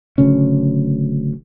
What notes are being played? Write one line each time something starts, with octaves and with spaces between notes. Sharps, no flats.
D1 D2 C#3 C#4